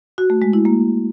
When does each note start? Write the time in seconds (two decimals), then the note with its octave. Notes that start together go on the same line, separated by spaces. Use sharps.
0.18 F#4
0.30 A3
0.42 G#3
0.53 E4
0.65 A#3